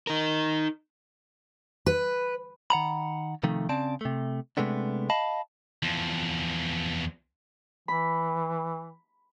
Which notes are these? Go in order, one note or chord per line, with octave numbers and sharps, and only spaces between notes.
D#4 A#4
B4
D#3 F#5 A#5 B5
C3 D#3 F3 A3
C#3 C4 D5 A5
C3 A3
C3 D#3 G#3 A3 B3 D4
D#5 F5 A5 B5
E2 F3
E3 B5